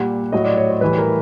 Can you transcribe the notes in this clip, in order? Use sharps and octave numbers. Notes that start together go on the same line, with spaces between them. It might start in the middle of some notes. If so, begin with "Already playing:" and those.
Already playing: A#2 G3 F#5
A2 F#3 D#5
D5
C#5
C5
A2 E3 G3 B4
A#4